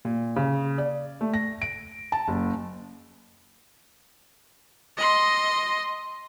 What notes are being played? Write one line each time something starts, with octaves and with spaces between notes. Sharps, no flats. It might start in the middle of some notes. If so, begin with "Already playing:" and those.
A#2
C#3
D5
A3
A#6
D7
A5
F#1
D#5 C6